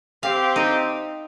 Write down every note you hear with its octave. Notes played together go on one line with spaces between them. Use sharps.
C4 G4 F5
D#4